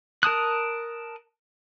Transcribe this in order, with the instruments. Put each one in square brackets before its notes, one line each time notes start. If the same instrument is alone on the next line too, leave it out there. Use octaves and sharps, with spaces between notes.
[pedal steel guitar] A#4 A5 D#6 F#6